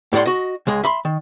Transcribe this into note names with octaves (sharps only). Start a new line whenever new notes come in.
A2 G4 D5 F#5 C6
F#4 D#5
C#2 G#3 G#4
E5 B5 C6
D#3